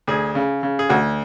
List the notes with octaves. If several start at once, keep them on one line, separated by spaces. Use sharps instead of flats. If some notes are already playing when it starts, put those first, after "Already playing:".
D2 G#4
C#3
C#3
G#4
D2 F#4